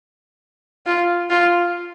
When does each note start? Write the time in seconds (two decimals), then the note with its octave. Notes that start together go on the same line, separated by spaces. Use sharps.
0.86 F4
1.30 F4